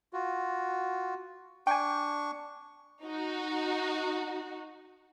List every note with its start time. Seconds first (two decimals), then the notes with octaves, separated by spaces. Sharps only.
0.13 F4 F#4
1.67 D4 G5 G#5 C#6
3.03 D#4 F#4